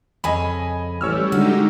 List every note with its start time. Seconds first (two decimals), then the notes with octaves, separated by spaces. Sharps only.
0.24 F2 C#3 C#5 D#5 G#5 B5
1.01 A1 G3 C#5 E6 F6
1.32 D3 G#3 D#4 F#4 G4